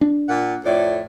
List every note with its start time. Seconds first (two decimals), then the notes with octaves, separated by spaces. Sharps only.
0.01 D4
0.29 A#2 A#3 F#5
0.64 F2 A2 D5